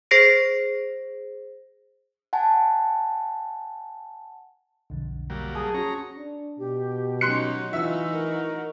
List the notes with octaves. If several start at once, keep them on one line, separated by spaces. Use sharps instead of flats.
G#4 C5 A#6 C7 D7
F#5 G#5 A5
B1 F2 D3
F#3 G3 A#3
G#4 A5
C#4 F#4 C#5 A#5
D4
B2 G4
F#3 C#4 D#4 C6 F#6 C#7
E3 D#4 F4 F#4 E5 E6
A#4